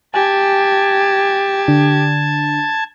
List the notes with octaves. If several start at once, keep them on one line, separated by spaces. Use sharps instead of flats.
G4 G#5 A5 G#6
D3 D4